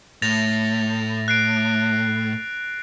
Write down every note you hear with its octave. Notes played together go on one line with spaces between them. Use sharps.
A2 A6 A#6 F7
F#6 C7 D7